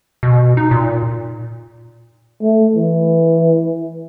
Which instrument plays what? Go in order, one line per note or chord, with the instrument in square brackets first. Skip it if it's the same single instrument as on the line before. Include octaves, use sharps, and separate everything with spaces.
[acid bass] B2
D#4
A#2
[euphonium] A3
E3